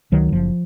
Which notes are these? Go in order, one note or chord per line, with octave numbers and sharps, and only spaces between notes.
C#2 D#3 F#3
F#1 F3